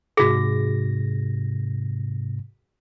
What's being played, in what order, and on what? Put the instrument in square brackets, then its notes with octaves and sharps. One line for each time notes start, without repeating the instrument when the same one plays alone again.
[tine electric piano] G#2 C3 A#6 [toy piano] F#4 G#4